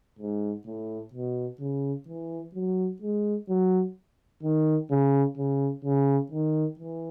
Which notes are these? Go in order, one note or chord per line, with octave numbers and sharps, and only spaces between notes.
G#2
A2
B2
C#3
E3
F#3
G#3
F#3
D#3
C#3
C#3
C#3
D#3
E3